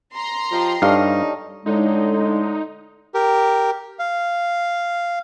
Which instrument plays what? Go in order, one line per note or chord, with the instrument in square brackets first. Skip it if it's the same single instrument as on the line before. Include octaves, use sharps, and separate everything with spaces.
[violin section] A#5 C6
[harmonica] F3 [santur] G4 D#5 G5
[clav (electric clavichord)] G2 F5 [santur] G3 A4 C#5 [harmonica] D#4
[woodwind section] A2 D3 G#3 [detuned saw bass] D#4
[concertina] G4 A#4
F5